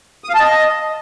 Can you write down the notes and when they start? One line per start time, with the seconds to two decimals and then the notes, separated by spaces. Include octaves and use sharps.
0.24 D#6
0.29 F5
0.35 A5
0.40 D#5